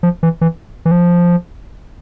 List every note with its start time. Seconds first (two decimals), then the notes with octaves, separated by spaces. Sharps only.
0.03 F3
0.23 E3
0.41 E3
0.85 E3
0.91 F3